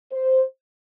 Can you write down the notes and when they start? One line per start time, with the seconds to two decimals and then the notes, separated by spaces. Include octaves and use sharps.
0.13 C5